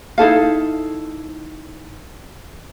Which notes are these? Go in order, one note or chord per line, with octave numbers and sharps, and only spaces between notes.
D#4 E4 A4 F5